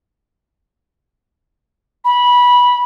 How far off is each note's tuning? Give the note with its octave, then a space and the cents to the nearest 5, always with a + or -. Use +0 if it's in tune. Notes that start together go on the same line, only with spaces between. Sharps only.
B5 -15